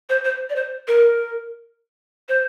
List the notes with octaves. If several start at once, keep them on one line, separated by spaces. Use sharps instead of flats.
C5
C5
D5
C5
A#4
C5